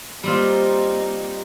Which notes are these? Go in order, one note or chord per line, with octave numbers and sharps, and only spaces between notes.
G3 A#3 C4 D#4 F4